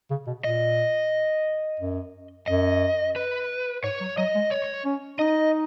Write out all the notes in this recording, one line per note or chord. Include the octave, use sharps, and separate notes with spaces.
C#3
B2
A#2 D#5
F#2
F#2 D#5
B4
G#2 C#5
F#3
F#3 D#5
G#3
C#5
C#4
D#4 D#5